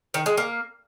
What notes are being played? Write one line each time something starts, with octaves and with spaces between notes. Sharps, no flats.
D#3
G#3
A#3